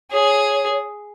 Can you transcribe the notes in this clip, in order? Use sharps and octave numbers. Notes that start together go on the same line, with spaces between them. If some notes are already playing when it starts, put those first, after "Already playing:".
G#4 C#5